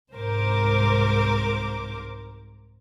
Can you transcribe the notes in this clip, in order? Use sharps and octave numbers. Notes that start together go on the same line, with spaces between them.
C2 G#2 A#4 C5 D6